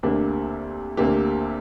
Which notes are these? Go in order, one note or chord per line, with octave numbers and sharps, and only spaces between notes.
D2 C3 A#3 D4 G4
D2 C3 A#3 D4 G4